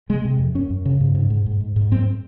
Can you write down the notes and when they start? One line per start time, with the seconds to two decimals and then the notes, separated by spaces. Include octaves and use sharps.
0.09 C3 G#3
0.25 C3
0.39 F2
0.55 F#2 C#4
0.70 F#2
0.85 C#3
1.01 G#2
1.15 G#2
1.30 G#2
1.46 G#2
1.60 G#2
1.76 G#2
1.91 F#2 C4